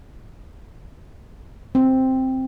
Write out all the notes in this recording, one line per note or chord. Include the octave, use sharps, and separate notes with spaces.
C4